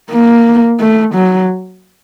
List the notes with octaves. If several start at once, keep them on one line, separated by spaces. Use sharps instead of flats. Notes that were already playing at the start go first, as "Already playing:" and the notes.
A#3
A3
F#3